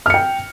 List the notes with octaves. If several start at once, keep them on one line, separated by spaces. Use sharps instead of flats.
G5 F6 C#7